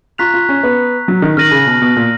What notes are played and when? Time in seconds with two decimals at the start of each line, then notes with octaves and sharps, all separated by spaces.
0.18 F4 A#5 C#6 F#6 B6 F7
0.34 F4
0.49 C#4
0.64 B3
1.08 F#3
1.22 D#3
1.37 D#3 F6 A#6 D#7 F#7
1.51 C#3
1.67 B2
1.82 B2
1.96 A#2